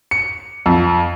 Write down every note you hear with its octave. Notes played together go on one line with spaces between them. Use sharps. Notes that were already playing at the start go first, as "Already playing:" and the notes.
C#7
F2